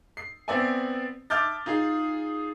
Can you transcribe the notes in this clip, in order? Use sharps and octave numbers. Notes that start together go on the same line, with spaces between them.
C7
B3 C4 C5 D5 E5 G#5
E5 A5 D6 F6 G6 A6
D#4 F4 G#4